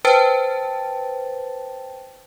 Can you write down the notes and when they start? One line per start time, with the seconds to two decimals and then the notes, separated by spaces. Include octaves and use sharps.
0.05 B4 C5 G5 A5 A6